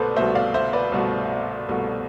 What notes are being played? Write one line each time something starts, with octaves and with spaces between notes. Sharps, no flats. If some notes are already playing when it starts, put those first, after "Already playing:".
Already playing: C2 B2 A3 A4 B4 C5 D5
C2 B2 A3 C5 E5
D5 F5
C5 E5
B4 D5
C2 B2 A3
C2 B2 A3